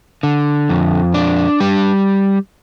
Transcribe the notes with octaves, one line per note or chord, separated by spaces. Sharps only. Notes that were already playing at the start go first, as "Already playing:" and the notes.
D3
F2
D4
G3